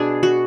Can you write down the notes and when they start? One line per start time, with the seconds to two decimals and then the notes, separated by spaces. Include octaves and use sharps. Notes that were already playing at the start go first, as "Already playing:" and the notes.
Already playing: B2 D4 G#4
0.23 F#4